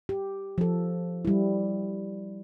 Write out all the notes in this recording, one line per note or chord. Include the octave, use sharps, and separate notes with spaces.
G4
F3 A4
G3 E4